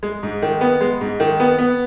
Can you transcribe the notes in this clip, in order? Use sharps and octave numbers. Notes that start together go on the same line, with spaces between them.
G#3
G#2
D#3
B3
G#3
G#2
D#3
B3
B3